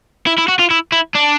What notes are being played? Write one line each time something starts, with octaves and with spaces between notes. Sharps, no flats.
E4
E4
F#4
F4
E4
E4
D4